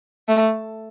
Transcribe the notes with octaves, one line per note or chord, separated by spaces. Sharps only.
A3